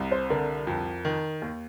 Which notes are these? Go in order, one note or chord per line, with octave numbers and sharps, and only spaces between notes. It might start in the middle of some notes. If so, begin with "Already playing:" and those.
Already playing: C2 C3
C5
D3 A#4
F2
D#3
D#2